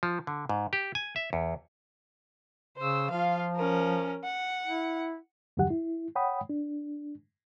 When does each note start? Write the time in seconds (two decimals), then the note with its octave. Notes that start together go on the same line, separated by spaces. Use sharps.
0.03 F3
0.27 D3
0.49 G#2
0.73 G4
0.95 G#5
1.16 E5
1.33 E2
2.78 C#3 C5 E6
3.10 F3 F4 F5
3.56 C#4 A#4
4.24 F#5
4.67 E4
5.57 E2 G2 D3 F#3 G4 F#5
5.70 E4
6.15 C#5 F#5 G5 B5 D#6
6.49 D4